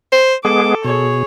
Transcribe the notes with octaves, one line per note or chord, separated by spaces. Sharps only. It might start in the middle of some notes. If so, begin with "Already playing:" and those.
C5
G#3 B3 G#4 A4 D6
B2 G#4 C#5